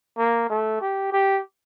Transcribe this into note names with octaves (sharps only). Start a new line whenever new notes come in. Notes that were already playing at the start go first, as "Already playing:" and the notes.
A#3
A3
G4
G4